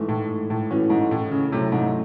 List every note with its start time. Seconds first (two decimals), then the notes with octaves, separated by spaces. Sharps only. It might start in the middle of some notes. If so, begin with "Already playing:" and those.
Already playing: G#2 E3 A3
0.09 A2
0.50 A2
0.70 A2 E3 A3 C#4 F#4
0.90 G#2
1.11 A2
1.31 C#3
1.52 A2 C3 F#3 A3 C#4
1.72 G#2